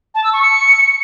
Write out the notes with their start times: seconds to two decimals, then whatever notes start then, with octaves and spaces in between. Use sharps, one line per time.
0.15 A5
0.24 E6
0.33 C#6
0.42 C#7